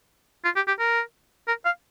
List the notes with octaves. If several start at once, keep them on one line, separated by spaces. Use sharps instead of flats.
F4
G4
G4
A#4
A#4
F5